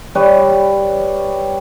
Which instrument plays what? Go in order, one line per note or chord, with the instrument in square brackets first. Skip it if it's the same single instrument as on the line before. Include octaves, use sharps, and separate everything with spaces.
[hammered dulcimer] G3 B4 C#5